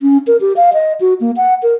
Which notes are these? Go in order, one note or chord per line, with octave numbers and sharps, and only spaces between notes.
C#4
A#4
G4
F5
D#5
F#4
A#3
F#5
A#4